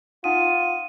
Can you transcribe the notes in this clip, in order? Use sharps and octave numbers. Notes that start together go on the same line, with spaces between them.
D#4 F4 F#5 D#6 D#7